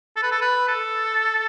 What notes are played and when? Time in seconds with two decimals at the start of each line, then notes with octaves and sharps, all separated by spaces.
0.16 A4
0.23 B4
0.31 A4
0.42 B4
0.68 A4